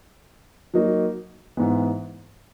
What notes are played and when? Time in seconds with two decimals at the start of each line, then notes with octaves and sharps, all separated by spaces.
0.74 F#3 A#3 D#4 F#4
1.57 G#2 E3 G#3 B3